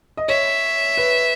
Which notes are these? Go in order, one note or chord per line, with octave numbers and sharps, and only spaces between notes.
D#5
C#5 E5
B4